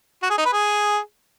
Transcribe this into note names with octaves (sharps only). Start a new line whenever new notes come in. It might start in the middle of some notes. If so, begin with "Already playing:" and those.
F#4
G#4
D#4
B4
G#4